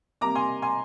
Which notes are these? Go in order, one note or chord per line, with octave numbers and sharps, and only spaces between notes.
C3 G3 A#3 A#5 D6
G#5 C6
G#5 C6